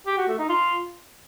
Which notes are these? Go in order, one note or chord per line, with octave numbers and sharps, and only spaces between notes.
G4
F#4
A3
D#4
F4